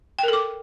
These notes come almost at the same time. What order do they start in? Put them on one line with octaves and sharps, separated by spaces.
G5 A#4 A4 D6